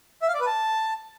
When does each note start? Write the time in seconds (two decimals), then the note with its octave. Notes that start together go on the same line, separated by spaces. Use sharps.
0.22 E5
0.28 F5
0.34 D5
0.40 B4
0.46 A5